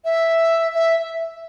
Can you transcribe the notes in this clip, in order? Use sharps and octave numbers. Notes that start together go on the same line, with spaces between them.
E5
E5